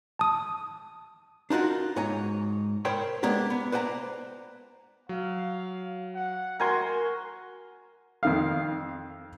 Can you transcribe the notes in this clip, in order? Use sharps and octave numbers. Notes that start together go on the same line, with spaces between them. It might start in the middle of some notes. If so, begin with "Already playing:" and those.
A5 D#6
D4 D#4 F4 F#4 A#4
G#2 C#5 G#5 A#5
A#4 C5 C#5 G5 B5 C6
G#3 A#3 B3 D4 G4
B3
B4 C5 D5 G5 A#5
F#3 F5
F#5
F#4 A#4 G#5 C6
F2 D#3 F5